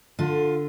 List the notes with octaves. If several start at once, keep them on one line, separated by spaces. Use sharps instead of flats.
D3 F4